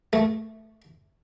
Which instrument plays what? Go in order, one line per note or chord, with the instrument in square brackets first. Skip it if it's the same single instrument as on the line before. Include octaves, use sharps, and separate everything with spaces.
[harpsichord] A3